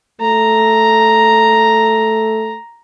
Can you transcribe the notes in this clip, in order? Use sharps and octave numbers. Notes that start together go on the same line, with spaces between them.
A3 A#5